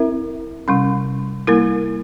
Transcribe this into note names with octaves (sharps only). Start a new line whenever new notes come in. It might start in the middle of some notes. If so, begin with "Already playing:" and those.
Already playing: C4 E4 A#4 E5
C3 G3 C#4
G3 A#3 E4 A#4